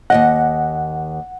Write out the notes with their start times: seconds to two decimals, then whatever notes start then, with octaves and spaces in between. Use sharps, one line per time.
0.10 D#2 C#3 D#5 F#5